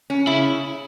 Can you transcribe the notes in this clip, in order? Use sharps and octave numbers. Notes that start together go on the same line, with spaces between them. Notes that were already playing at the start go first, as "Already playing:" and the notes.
C#4
C#3 E4